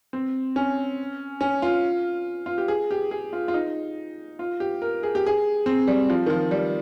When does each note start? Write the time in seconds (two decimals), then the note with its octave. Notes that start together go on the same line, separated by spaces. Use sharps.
0.13 C4
0.56 C#4
1.41 C#4
1.62 F4
2.46 F4
2.58 G4
2.68 G#4
2.91 G4
3.11 G#4
3.33 F4
3.48 F4
3.54 D#4
4.39 F4
4.60 G4
4.82 A#4
5.03 G#4
5.15 G4
5.26 G#4
5.66 C4
5.87 G3
6.10 F3
6.26 D#3
6.30 F3
6.51 G3